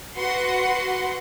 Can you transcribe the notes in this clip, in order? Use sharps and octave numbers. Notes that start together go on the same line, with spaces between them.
F#4 B4 F#5 C6